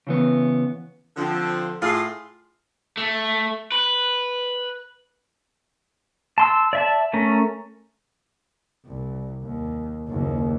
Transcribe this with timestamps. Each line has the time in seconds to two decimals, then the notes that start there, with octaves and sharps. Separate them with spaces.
0.07 C#3 E3 B3
1.16 D3 F3 C4
1.82 A2 F4 G#4 F5 C6
2.97 A3
3.72 B4
6.38 A5 C6 E6
6.73 D5 E5 A5
7.13 A3 C#4 A#4
8.86 C2
9.44 D#2
10.08 F#1 D#2